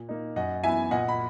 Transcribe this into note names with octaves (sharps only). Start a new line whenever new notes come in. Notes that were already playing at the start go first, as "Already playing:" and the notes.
Already playing: A#2
A#3 D#4
F#2 D#5 F#5
E3 B3 E4 E5 G#5
A#2 D#5 F#5
B5